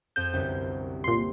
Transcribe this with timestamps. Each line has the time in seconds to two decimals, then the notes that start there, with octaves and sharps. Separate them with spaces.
0.16 F2 G6 D#7 E7
0.33 G1 C2 F#2
1.04 A#2 C6